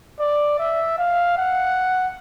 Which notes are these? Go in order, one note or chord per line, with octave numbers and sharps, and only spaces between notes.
D5
E5
F5
F#5